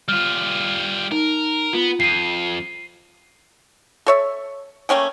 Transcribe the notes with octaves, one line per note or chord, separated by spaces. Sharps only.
G3 F4 F6
D#4 A#4
B3 F4
F2 C7 D#7
A4 C#5 E5
A3 A#3 C#4 G5